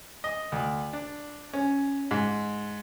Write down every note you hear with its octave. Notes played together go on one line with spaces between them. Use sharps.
D#5
D2
D4
C#4
G#2